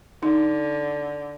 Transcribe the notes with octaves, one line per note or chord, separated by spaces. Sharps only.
D3 D#4